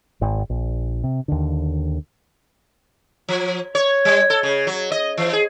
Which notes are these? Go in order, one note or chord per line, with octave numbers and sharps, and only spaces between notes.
G#1
A#1
C3
D#2 D3
F3
C#5
G3
A4
C#3
F#3
D#5
E3
G#4